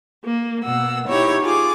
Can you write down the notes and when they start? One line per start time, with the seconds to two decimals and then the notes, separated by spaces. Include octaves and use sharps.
0.24 A#3
0.64 B2 A#3 F#5 E6
1.08 D#4 E4 G4 C#5
1.42 F4 G#4 D6